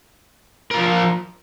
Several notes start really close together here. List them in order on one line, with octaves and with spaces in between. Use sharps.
A#4 F4 F3